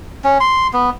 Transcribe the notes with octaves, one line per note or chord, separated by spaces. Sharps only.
C#4
C6
B3